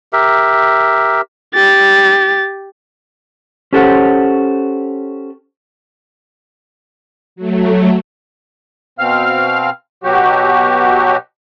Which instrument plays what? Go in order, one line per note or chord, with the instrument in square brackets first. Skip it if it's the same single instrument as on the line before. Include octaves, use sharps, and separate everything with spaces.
[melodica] G4 A#4 E5
[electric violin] G4 A6
[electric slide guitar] C#4 G4 A4 C5 C#5 F#5
[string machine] F#3 A3
[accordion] B2 C4 F5 F6
B2 F#3 F#4 G4